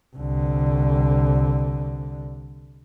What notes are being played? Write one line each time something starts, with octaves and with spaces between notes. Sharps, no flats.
C2 D3